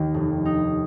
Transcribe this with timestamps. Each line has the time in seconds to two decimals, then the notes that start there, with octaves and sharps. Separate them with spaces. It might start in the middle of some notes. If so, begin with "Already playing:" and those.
Already playing: D#2 D#3
0.14 F1
0.45 D#4